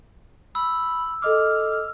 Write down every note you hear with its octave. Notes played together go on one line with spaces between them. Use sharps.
B5 E6
A4 D#5 D6 F6